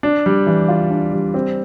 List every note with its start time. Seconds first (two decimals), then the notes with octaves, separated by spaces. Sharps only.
0.03 D4
0.26 G3
0.47 E3
0.68 F4
0.90 D4
1.13 G3
1.34 C4